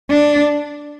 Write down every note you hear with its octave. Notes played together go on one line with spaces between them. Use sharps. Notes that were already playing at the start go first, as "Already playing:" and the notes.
D4